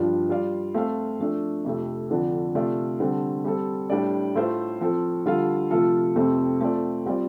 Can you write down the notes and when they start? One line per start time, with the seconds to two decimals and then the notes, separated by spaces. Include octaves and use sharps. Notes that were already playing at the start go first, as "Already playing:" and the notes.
Already playing: G2 F3 D4 F4
0.29 G3 F4 D5 F5
0.74 A3 C4 A4 F5
1.19 F3 A3 D4 A4
1.65 F2 C3 A3
2.10 F2 D3 F3 D4
2.55 C3 A3 F4 D5 F5
3.00 D3 G3 C4 A4
3.45 G3 C4 A4
3.90 A2 G3 D4 G4 D5
4.35 A2 A3 F4 C5 F5
4.81 F3 C4 A4
5.26 D3 G3 F4 A4 F5
5.71 C3 F3 A3 F4 A4
6.15 F2 C3 A3 C4 A4
6.61 A3 C4 F4 A4 D5
7.06 G3 C4 F4 D5